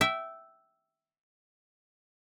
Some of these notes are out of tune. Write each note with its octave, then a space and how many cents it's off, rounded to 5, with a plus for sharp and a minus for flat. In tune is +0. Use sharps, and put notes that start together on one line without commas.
E5 +0 G5 -25